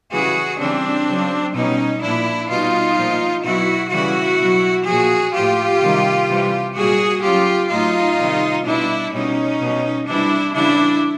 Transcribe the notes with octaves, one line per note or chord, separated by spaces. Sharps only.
C#3 E3 G3 F#4 G#4
C#3 E3 G3 C4 D4
C#3 F#3
B2 G3 C#4 D#4
A#2 F3 D4 E4
B2 G3 D#4 F4
A#2 F3
B2 F#3 E4 F#4
C#3 E3 G3 E4 F#4
B2 F#3
A#2 F3 F#4 G#4
A2 F3 F4 G4
C3 D#3 G3
C3 E3 G3
A#2 G3 F#4 G#4
C#3 F#3 F4 G4
A2 F#3 D#4 F4
C3 D#3 G3
B2 G3 D4 E4
B2 G3 C#4 D#4
B2 G3
C3 E3 G3 D4 E4
C#3 E3 G3 D4 E4